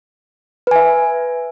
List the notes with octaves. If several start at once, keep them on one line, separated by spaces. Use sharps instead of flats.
B4 E5 G#5